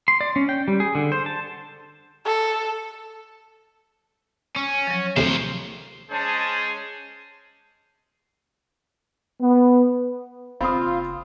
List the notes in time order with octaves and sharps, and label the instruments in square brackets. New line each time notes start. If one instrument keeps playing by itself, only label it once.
[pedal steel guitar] C6
D5
C#4
G5
G3
G#4
D3
C5
A5
[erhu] A4
[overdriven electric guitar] C#4
[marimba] F3 F#3
[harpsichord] D2 A2 C3 [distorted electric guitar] D#3 C5 [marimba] F3
[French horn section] G#3 C#4 G#4 [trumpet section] D4 C5 A5
[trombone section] B3
[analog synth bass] F#1 [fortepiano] C4 [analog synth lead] F4 [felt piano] B5 D#6